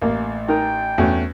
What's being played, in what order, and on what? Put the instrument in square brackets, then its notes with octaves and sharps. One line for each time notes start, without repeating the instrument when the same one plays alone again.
[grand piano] A1 [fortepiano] A#3
[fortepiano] D#4 A#4 [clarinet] G5
[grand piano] E2 [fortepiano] A3 C#4 F#4